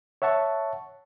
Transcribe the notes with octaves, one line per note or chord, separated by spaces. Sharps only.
C#5 E5 F#5 A5 C#6